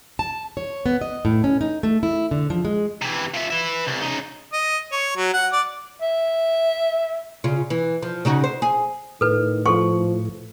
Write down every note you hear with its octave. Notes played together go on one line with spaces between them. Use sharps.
A5
C#5
B3
D#5
A2
C#4
D#4
A3
E4
D3
F3
G#3
C3 E3
F3 E5
B4 E5
C2
C#3 D#4
D#5
C#5
F#3
F#5
D5
E5
C#3 F4
E3
F3
C#3 D#4 F#4
C5
G#4
A2 D#3 A4 B4
F3 A4 C6 C#6